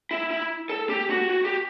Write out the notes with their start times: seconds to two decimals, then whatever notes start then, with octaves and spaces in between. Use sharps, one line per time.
0.11 E4
0.31 E4
0.70 A4
0.89 G4
1.10 F#4
1.29 F#4
1.45 G4